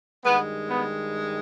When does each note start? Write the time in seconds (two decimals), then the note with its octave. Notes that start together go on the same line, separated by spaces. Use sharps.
0.25 G2 D#3 G#3 B3
0.70 B3